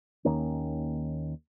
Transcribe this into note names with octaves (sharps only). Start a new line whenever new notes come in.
D#2 D#3 A#3 C#4